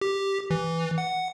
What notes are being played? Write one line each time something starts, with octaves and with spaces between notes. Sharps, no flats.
G4
E3
F#5